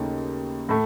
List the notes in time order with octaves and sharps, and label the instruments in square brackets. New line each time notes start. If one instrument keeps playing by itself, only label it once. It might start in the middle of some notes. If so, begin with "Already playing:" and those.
Already playing: [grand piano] D#2 C#3 A3 D#4
A2 A3